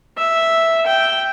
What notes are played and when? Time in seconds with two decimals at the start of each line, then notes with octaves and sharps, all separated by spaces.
0.17 E5
0.86 G5